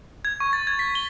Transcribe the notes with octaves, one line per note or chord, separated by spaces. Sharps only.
G#6
C#6
A6
G#6
B6
G7